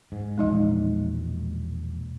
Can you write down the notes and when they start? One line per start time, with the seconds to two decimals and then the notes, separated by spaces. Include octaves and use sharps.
0.12 G#2
0.38 E1 A#1 G#3 D#4 D#5